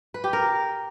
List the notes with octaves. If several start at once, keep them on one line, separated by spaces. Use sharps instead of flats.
B4
G4
A#4